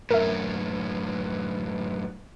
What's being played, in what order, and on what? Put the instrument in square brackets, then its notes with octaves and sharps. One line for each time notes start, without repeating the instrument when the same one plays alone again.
[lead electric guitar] F#2 A2 [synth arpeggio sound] A#4 E5